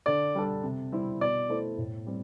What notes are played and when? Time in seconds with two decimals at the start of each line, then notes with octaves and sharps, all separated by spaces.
0.06 D3 D5
0.35 G3 D4 A4
0.64 C3
0.92 G3 C4 E4
1.21 B2 D5
1.49 A3 E4 A4 C5
1.78 A2
2.07 G3 C4